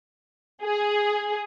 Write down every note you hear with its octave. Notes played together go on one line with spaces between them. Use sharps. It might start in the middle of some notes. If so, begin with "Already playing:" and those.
G#4